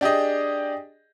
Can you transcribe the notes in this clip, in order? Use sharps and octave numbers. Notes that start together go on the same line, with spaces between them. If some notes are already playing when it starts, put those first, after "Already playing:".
D4 G4 G#4 D#5